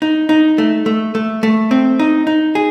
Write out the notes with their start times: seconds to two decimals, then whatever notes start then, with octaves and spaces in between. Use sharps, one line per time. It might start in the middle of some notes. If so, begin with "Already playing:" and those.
0.02 D#4
0.29 D#4
0.58 A3
0.86 A3
1.15 A3
1.43 A3
1.71 C4
1.99 D#4
2.27 D#4
2.55 G#4